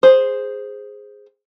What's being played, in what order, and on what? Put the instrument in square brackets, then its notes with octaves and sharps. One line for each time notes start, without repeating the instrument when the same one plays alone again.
[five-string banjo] G#4 C5